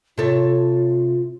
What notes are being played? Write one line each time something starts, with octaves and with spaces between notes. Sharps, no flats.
C3 F4 A4 C#5